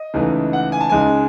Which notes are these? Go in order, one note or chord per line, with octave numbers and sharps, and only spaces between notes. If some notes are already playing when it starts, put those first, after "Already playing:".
Already playing: D#5
C#2 C#3 E3 A3 D#4
F#5
G#5
A5
C#2 C#3 G#3 D#4 G#5